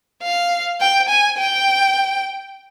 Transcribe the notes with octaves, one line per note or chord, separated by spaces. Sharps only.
F5
G5
G#5
G5